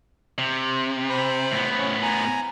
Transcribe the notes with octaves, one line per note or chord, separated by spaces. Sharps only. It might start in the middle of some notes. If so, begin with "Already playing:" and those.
C3
C5 B5
A2 B3
C#4
G#5 A#5